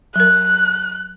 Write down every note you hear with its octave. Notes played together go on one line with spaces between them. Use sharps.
F#3 A#4 F#6